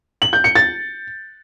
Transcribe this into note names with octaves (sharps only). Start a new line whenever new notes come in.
F#7
G6
C#7
A6